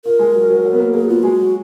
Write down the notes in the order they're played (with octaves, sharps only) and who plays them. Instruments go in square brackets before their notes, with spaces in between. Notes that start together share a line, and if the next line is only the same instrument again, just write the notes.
[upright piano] F4 [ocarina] A#4
[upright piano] G#3
F#3
F#3
F#3
B3
A#3
[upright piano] A#3 [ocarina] G#4
[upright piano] B3 [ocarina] F4
[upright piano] G#3 [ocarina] F#4
[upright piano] F#3